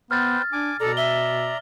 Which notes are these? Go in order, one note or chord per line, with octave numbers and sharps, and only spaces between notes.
B3 B4 C5 G5 F6 A6
D4 G#5 D6
B2 A4 D5 A#5
E5 G7